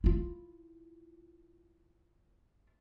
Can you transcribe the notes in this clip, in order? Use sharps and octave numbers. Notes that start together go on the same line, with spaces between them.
E4 F4